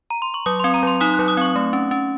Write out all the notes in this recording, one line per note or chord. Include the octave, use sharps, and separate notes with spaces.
A#5
C6
C#6
F#3 D#6
C6
C4
A#5
F#3 C6
D#4 D#6
F#6
F#3
D#6
C4 C#6
A3
C#4
C#4